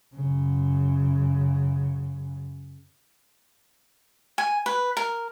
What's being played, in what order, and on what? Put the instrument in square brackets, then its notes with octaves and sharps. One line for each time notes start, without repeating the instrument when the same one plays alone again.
[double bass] F#2 C#3
[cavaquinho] G#5
B4
A#4